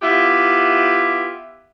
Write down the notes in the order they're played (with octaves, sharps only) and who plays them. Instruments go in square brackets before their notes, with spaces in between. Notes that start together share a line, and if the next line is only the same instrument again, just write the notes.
[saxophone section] B3 E4 F4 G4